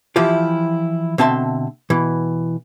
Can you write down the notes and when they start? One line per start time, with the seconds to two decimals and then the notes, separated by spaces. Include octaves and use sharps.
0.16 E3 F3 E4 F4 G4
1.18 B2 D3 C4 E5 A5 C6
1.90 B2 E3